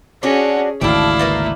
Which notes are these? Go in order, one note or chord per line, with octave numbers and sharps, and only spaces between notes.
C#4 D4 F#4 G#4
G#1 D2 C#3 E4 D5 F5 G5 A5
A3 A#3 B4